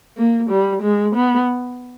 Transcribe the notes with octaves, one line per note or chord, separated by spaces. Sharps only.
A#3
G3
G#3
B3